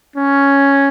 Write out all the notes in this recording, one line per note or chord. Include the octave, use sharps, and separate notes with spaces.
C#4